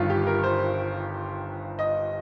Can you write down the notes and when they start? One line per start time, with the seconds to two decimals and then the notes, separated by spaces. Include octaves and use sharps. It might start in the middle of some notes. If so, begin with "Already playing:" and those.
Already playing: G1 G2 D#3 F4
0.10 G4
0.27 A#4
0.44 C5
1.79 D#5